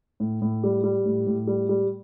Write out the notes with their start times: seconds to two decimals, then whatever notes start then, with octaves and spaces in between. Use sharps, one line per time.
0.20 A2
0.42 A2
0.63 G3
0.84 G3
1.06 A2
1.27 A2
1.47 G3
1.69 G3